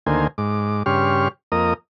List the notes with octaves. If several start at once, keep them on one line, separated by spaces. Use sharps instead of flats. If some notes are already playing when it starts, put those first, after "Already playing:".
D2 D#3 A#3 C5 G#5
G#2 D6
G2 C#3 G4 C6 C#6 F6
F2 A#3 A#4 D#5 D#6